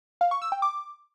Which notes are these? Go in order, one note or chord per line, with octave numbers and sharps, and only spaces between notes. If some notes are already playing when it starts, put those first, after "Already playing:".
F5
C#6
E6
G5
D6